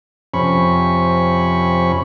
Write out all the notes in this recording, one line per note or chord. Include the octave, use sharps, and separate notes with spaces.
F2 C3 C#4 B5 C#6